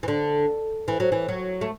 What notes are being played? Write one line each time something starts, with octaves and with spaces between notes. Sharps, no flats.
E3
D3
E3
F#3
E3
F#3
A3